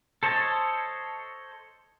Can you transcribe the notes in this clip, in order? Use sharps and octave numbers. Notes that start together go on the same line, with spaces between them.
A4 C5 C#5 D#5 A5